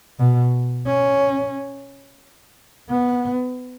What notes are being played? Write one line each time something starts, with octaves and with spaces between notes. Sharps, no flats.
B2
C#4
B3